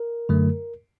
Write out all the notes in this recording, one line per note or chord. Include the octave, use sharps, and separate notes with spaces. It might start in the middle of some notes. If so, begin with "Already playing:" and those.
Already playing: A#4
F#2 D3 F#3 A3